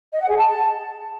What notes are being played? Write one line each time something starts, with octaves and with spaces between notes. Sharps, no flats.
D#5
F#5
G#4
A5